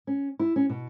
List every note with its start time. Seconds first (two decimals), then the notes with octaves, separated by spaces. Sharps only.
0.07 C#4
0.39 E4
0.56 C#4
0.69 B2